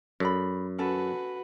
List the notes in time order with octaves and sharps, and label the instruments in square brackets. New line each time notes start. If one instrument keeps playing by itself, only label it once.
[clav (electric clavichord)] F#2 [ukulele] A4 D5 B5
[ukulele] C#4 A4 [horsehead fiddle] F#4 B4